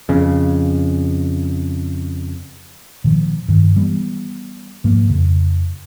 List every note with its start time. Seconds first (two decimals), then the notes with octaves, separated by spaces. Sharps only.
0.09 F2 C#3
3.04 A#2 D#3 F3
3.48 G2 D#3
3.76 E3 G3 B3
4.84 G#2 F3 A#3
5.09 F2 C#3